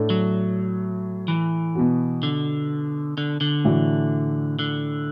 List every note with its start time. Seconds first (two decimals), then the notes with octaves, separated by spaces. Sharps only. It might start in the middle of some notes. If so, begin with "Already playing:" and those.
Already playing: A2 A3 D4
0.10 F#3
1.28 E3
1.75 B2 B3 F#4
2.23 D3
3.18 D3
3.41 D3
3.65 A2 E3 A3 D4 F#4
4.59 D3